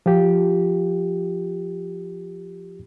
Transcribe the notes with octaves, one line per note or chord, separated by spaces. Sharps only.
F3 F4 G4